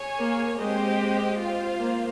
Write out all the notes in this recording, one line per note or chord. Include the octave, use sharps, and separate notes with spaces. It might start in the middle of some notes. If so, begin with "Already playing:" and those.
Already playing: G#4 C#5 G#5
A#3
G#3 C4 G4 C5 D#5
F4 C5 F5
A#3